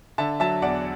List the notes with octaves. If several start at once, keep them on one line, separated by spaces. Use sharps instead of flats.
D3 E5 A5
F#3 E5 A5
E2 D5 F#5